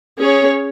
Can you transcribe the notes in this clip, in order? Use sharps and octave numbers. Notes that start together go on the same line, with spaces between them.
C#4 G#4 C#5